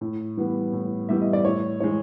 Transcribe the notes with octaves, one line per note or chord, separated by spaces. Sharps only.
A2
E3 G3 B3
A2
E3 G3 B3 E5
D#5
D5
A2 C#5
E3 G#3 C#5